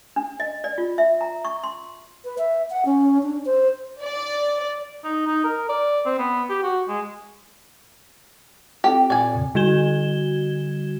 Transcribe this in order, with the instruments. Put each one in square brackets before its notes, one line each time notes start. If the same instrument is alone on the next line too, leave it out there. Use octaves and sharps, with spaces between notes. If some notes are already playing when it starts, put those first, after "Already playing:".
[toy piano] D4
D#5
D5
F4
E5
A#5
C#6
C6
[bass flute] B4
E5
F#5
C#4
D4
C5
[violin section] D5
[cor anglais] D#4
D#4
A#4
D5
C4
B3
G4
F#4
G#3
[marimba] C4 F4 A4 [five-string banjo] G4
[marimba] A#2 [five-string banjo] D5 G#5
[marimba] F2 A#2 C#3
[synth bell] D3 G3 F#4 G#6 E7 G7